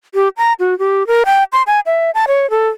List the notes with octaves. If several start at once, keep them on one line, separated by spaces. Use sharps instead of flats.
G4
A#5
F#4
G4
A#4
G5
C6
G#5
E5
A5
C#5
A4